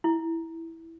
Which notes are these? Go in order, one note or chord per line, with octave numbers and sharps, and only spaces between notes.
E4